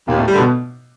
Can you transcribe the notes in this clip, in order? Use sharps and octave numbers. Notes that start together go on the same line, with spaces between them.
D#2 A#2 A#3
A2 A3
D3 G3
B2 B3